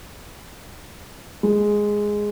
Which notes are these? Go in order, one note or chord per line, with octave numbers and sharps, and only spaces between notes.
G#3